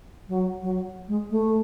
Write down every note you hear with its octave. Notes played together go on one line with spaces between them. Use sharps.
F#3
F#3
G#3
A3